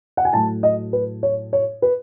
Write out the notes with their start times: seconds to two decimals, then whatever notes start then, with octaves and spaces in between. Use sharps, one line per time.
0.17 F#5
0.25 G#5
0.33 A2 F#3 A3 A5
0.63 D#5
0.93 B4
1.23 C#5
1.53 C#5
1.82 B4